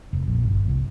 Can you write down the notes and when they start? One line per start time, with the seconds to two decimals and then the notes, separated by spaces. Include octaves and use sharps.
0.13 F1
0.28 A#1
0.43 G1
0.68 C2